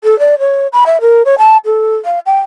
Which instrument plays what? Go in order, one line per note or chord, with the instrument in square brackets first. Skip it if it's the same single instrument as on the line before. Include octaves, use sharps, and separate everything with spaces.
[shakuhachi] A4
D5
C#5
B5
E5
A#4
C#5
A5
A4
F5
G5